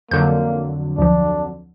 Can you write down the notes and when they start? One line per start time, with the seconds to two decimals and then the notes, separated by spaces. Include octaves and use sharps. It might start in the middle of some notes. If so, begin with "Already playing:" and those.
0.11 F2 D3 F#3 A#3 G6
0.98 D2 F3 D4